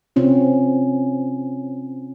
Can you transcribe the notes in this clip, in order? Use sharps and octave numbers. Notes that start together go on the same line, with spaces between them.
C3 C4 C#4 F4